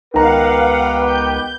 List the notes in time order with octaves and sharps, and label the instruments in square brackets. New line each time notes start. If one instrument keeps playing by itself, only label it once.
[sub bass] C#2 [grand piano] D#3 A#5 [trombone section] B3 G4 B4 [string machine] F5 F#5
[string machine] G6